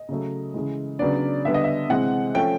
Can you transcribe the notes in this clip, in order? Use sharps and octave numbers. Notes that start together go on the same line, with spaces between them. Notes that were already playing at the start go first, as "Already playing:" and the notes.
Already playing: D#5
C#3 F#3 A3
C#3 E3 G#3
C#3 F#3 B3 D4 D5
D3 G3 B3 D4 E5
D#5
E5
C3 E3 G#3 C4 F#5
F3 A3 C#4 G5